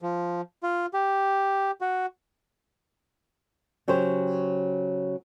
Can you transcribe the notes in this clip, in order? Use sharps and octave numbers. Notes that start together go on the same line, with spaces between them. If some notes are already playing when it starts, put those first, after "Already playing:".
F3
F4
G4
F#4
C#3 F#3 G4 C5